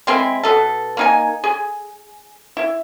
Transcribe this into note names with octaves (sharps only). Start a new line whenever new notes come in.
G#3 C4 E4
B2 A4
A#3 D#4 G#5
G#4
E4